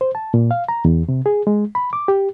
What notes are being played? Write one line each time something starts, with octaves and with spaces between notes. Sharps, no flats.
C5
A5
A#2
F5
A#5
E2
C3
G#4
G#3
B5
D6
G4